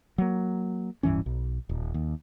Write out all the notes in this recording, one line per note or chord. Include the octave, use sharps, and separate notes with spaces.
F#3 A#3
D1 G2 E3 C#4
B1
D#1
D#2